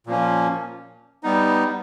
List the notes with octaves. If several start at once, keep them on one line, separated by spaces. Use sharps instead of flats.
A#2 F3 A#3 C#4
G3 B3 D#4